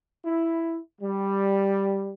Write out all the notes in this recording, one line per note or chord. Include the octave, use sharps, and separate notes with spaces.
E4
G3